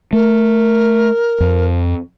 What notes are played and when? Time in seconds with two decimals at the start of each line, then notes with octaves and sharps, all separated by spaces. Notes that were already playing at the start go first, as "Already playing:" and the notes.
0.13 A3 A#4
1.40 F2